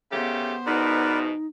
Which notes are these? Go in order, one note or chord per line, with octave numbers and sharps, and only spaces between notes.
C#3 A3 B3 G4 C5
E2 G#2 B2 D#4 A#4 B4 D5